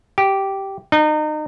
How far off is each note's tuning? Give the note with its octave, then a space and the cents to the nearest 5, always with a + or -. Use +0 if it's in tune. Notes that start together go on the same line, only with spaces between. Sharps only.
G4 -10
D#4 -30